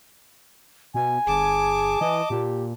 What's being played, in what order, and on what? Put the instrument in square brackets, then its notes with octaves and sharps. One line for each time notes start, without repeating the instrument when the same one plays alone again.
[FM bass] B2 [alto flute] G#5
[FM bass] G1 [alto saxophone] G#4 [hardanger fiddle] A5 D6
[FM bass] E3 [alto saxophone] D#5
[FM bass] A#2 [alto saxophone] G4